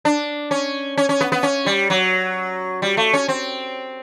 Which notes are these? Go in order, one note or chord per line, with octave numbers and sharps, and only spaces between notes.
D4
C#4
C#4
C#4
B3
B3
C#4
G3
F#3
G3
A3
C#4
C4